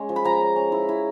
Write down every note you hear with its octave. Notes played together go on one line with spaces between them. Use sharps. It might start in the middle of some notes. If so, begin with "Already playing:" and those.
Already playing: G#3 C#4
F3
B5
F3 A#5
C#4
C#4
E4
E4